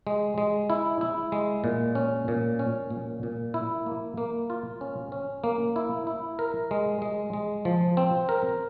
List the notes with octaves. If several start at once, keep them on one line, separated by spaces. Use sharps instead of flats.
G#3
G#3
E4
E4
G#3
A#2
C#4
A#2
C#4
A#2
A#2
E4
A#3
A#3
F4
C#4
C#4
A#3
E4
E4
A#4
G#3
G#3
G#3
F3
C4
A#4